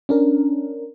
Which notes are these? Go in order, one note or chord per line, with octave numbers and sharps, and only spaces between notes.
C#4 D4 A#4